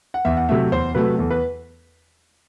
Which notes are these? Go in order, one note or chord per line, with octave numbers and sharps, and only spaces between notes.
F#5
E2 E5
F#5
C3 F#3 A3 E5
E2 C5
C3 F#3 A3 B4
E2 A4
B4